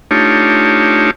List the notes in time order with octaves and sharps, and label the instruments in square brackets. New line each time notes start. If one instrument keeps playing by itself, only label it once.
[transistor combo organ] A3 D4 D#4 F4 G4 C#5